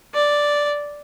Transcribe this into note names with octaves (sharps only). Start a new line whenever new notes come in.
D5